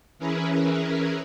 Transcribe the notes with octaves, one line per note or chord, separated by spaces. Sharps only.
E3 C#4 E4 G#4 A#4 B4